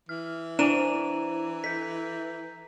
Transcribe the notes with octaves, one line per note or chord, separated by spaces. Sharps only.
E3 F6
D4 E4 C5 G#5 A#5 D#7 E7
A4 G6 B6